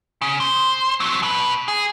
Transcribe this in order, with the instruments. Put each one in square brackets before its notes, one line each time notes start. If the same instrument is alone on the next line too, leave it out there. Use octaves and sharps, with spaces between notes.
[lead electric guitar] C#3
C5
F#3 C4
B2 B4
G#4